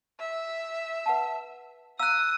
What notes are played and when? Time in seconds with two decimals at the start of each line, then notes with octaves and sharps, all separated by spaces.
0.20 E5
1.06 B4 F#5 A5
2.00 F5 A#5 D#6 E6 F#6